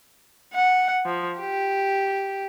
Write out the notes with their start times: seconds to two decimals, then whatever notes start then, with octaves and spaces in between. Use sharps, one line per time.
0.54 F#5
1.05 F3
1.39 G4